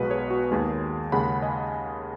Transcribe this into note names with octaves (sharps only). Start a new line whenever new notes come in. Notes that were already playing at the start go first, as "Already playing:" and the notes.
Already playing: B1 B2 G#3 B3 F#4 B4
G#4 C#5
F#4
D#2 D#3 G#3 G#4
D#2 C#3 G#3 F#5 B5
D#5 G#5